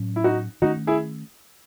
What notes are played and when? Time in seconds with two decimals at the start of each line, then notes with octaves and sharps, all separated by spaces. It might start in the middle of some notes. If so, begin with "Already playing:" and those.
Already playing: A2 F#3 C#4
0.16 E4
0.24 D#4 F#4
0.62 D#3 A3 C#4 D#4 F#4
0.87 E4 G#4